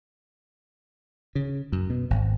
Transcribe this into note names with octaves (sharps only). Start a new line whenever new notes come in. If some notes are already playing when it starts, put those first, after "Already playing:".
C#3
F#2
B2
G#1